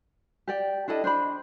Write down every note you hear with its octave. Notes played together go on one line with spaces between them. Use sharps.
G4 D5 G5
D4 E4 A4 D#5
D4 C5 D#5 B5